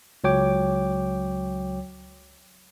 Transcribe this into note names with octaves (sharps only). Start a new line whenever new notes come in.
C#2 F#3 C#5 G5 D6